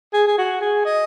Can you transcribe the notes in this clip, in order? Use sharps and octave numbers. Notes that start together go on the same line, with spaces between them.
G#4
G#4
F#4
G#4
D#5